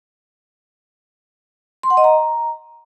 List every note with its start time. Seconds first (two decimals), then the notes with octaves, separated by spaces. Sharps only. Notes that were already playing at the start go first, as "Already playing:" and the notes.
1.83 C6
1.90 F#5
1.97 D#5
2.04 A#5